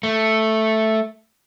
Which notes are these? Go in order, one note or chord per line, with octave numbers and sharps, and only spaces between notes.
A3